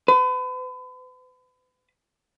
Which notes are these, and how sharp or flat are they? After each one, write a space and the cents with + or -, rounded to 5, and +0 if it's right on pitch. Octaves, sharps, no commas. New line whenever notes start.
B4 +40